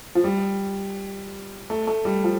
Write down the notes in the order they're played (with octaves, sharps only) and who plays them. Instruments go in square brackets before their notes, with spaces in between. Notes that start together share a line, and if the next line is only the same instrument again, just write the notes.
[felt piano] F3
G3
A3
A3
G3
F3